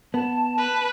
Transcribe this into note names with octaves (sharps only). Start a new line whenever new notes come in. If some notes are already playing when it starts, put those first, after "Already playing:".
B3 A5
B4